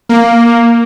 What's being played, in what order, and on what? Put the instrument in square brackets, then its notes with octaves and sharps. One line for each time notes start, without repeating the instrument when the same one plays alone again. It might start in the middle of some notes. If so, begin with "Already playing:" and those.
[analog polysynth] A#3